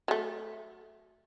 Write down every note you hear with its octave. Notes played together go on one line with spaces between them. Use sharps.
F#3 A3